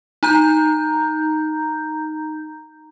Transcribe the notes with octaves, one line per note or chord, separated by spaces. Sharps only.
D#4 A#5 G6